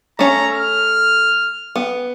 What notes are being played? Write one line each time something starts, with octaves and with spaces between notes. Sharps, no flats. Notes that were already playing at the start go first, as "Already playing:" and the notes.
A3 C#4 A#5
F6
B3